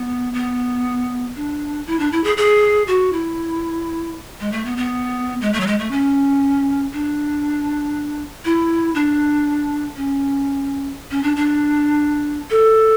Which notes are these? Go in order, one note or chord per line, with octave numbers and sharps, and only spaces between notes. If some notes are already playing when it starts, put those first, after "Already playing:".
Already playing: B3
B3
D4
E4
D4
E4
G#4
G#4
F#4
E4
G#3
A3
B3
B3
G#3
A3
F#3
G#3
A3
C#4
D4
E4
D4
C#4
C#4
D4
D4
A4